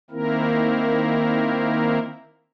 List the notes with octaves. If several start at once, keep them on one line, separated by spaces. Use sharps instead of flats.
D#3 A#3 C4 E4 A#4